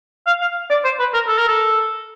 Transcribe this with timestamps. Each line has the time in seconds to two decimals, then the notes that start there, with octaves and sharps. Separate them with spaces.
0.27 F5
0.41 F5
0.70 D5
0.84 C5
0.99 B4
1.14 A#4
1.28 A4
1.38 A#4
1.48 A4